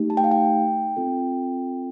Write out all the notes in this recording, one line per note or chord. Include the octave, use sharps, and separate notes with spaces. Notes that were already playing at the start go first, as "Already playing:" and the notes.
Already playing: A3 D#4 G4
A5
G5
F5
G5
C4 F4 A4